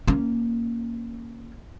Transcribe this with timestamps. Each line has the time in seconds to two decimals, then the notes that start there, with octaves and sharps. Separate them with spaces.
0.08 A#3 C#4